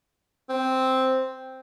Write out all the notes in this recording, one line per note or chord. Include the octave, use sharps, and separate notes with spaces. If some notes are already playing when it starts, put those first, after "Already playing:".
C4